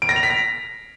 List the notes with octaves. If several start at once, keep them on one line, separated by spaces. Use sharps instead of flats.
D7
A#6
F7
B6
A#6